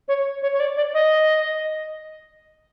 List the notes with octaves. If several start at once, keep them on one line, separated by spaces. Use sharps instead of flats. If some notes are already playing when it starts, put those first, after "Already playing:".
C#5
C#5
C#5
D5
D5
D#5